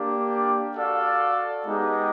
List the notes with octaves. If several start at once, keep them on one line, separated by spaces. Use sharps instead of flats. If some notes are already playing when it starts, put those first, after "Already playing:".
Already playing: A#3 D4 G4
F#4 A4 D5 F5
G#3 B3 D#4 G4